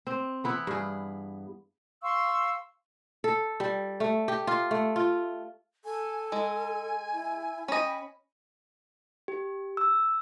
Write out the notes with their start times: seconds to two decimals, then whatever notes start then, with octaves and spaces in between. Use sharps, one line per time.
0.07 C4
0.44 E3 B3 E4
0.67 G2 G#4
2.03 F5 C6 C#6 E6
3.24 A4
3.60 G3
4.00 A3
4.28 G4
4.47 F4
4.71 A3
4.96 F4
5.85 A4 G#5
6.32 G#3 G#5
7.13 E4
7.68 C#4 D#5 G5 B5
9.28 G4
9.77 E6